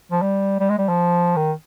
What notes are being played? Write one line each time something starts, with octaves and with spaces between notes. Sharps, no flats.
F3
G3
G3
G#3
G3
F3
D#3